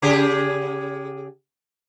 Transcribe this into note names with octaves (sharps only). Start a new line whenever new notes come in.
C#3 G4 G#4